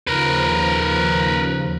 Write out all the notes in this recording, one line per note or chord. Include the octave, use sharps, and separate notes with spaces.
D#2 C#3 F3 A#4 B4